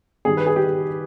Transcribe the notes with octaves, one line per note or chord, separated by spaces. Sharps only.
G2 D#3 G3 G#4
B4
G#4
G4